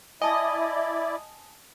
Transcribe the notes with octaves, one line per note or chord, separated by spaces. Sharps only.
E4 D5 D#5 G#5 A5 D#6